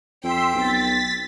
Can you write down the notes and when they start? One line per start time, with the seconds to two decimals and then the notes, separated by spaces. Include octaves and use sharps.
0.24 F2 G5 C6 E6 B6
0.55 B1 A6 B6